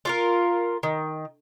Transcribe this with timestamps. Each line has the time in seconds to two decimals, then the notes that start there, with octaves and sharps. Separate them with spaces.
0.05 F4 F#4 A#4
0.83 D#3